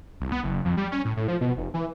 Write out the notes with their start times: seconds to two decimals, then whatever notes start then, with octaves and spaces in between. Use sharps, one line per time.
0.20 C2
0.32 B3
0.43 F#1
0.65 F2
0.77 G3
0.92 C#4
1.05 A2
1.17 A2
1.28 F3
1.41 B2
1.57 F1
1.74 E3